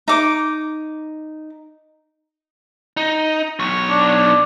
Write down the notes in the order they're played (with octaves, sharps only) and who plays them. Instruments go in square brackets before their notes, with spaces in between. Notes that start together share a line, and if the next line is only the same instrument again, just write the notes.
[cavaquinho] D#4 D6
[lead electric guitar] D#4
B1 C#5
[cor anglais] D4